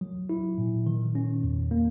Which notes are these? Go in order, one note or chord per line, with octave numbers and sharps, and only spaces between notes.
F#3
E4
A#2
D#3
C#4
E2
A#3